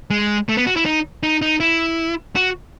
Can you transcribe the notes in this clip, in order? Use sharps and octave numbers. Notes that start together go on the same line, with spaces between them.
G#3
A3
B3
F#4
E4
D#4
D#4
D#4
E4
F#4